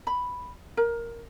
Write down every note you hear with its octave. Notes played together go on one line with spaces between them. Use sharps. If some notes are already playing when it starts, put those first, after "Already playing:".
B5
A#4